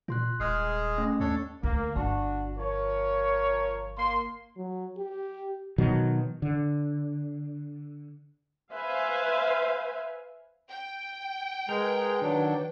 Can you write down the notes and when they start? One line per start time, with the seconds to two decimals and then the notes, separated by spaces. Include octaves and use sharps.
0.08 A#2 F4 C6 F#6
0.40 D#1 G#3 G#4 F6 C7
0.98 A3 C#4
1.20 D#2 D4 A4 C#5
1.63 D2 A#3
1.95 G1 D4 F#4
2.58 F3 A#4 C#5
3.98 A#3 C6
4.57 F#3
4.97 G4
5.78 B2 D#3 F#3
6.42 D3
8.74 B4 C5 E5 F5 G#5
10.71 G5
11.69 G#3 G#4 A#4 B4
12.22 D#3 F#3 D4